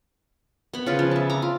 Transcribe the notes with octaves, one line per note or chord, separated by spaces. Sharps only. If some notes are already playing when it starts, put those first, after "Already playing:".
B3 B5
C#3 F4 B4
F3
E5 A5
A#5 D6
F4